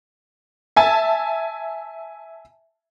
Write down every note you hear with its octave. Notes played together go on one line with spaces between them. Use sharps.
E5 G#5 A5